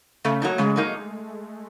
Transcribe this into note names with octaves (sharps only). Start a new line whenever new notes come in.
C#3 A3
F#3 A#3 D#4
C#3 G#3
F#3 A#3 D#4